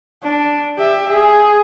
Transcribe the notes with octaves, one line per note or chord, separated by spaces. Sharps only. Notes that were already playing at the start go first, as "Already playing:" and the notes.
D4
G4 E5
G#4